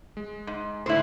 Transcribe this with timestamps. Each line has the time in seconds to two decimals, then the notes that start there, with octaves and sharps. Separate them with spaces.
0.17 G#3
0.47 G#2
0.86 A2 D3 E4 C5